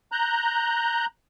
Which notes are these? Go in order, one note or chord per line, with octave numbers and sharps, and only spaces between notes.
A#5 F#6 G6